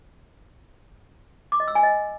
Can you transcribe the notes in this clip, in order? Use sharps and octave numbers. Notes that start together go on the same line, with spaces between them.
D6
D#5
E6
G#5
D#5